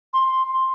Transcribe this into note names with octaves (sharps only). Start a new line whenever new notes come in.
C6